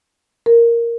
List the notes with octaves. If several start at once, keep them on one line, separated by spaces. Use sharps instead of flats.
A#4